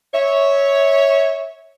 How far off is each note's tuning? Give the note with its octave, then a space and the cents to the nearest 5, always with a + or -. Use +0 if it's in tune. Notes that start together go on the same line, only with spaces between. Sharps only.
C#5 +0 E5 -20